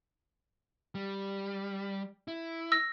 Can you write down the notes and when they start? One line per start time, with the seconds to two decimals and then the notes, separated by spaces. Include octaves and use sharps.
0.95 G3
2.28 E4
2.72 E6 A#6